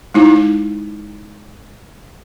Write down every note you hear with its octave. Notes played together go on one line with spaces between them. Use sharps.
G#3 D#4 E4